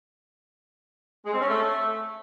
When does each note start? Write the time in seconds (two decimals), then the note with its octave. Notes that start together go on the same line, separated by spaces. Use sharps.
1.24 G#3
1.32 C4
1.40 C#4
1.49 A3